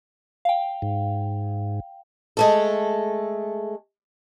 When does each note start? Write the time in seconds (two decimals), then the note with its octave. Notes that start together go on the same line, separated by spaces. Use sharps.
0.45 F5 G5
0.82 G#2
2.37 G#3 A3 A4